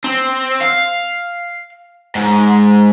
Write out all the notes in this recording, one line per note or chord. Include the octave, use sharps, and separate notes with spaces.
C4
F5
G#2